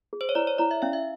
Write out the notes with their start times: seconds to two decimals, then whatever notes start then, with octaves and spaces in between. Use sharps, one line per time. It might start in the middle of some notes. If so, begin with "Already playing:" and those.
0.13 G#4
0.21 C5
0.29 C#5
0.35 E4 D5
0.47 C#5
0.58 E4 D5
0.71 E5
0.82 C#4 F5
0.93 E5